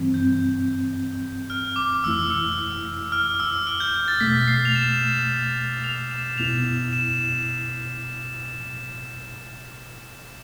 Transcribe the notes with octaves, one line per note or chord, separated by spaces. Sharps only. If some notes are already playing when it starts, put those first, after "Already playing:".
Already playing: G2 E3 G3 C4
G6
F6
D6
F2 E3 A3 E4 E6
E6
F6
E6
F6
G6
G6
A6
E2 B2 A3 B6
C7
F7
E7
F7
E7
E7
E2 B2 B3 E4 F7
E7